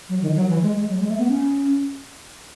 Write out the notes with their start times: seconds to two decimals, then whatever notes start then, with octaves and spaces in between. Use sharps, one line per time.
0.09 F#3
0.22 D#3
0.36 F#3
0.49 E3
0.62 G#3
0.76 G#3
0.89 F#3
0.99 G#3
1.09 A3
1.18 B3
1.29 C#4